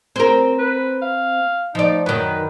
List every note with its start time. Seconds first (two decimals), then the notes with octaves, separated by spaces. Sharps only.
0.16 C4 A#4
0.59 B4
1.02 F5
1.75 F3 D#4 D5
2.06 F#2 D#3 B4